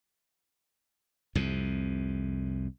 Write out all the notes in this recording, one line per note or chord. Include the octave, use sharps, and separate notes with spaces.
C2 F2 C3